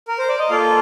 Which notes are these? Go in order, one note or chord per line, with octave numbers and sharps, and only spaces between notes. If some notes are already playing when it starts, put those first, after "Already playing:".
A#4
C5
D5
D#5
A#3 F4 A4 F5